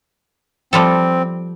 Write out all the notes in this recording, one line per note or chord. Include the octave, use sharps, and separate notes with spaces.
F3 G3 C4 A4